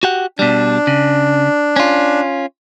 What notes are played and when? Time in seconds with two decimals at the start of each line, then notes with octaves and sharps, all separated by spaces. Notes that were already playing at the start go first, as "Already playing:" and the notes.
0.03 F#4 G4 F#5
0.39 B2 G3 D4
0.87 C#3
1.76 C#4 F4